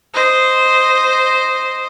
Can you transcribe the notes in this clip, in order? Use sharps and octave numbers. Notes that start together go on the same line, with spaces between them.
C5 D#5